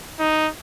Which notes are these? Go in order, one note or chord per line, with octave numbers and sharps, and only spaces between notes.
D#4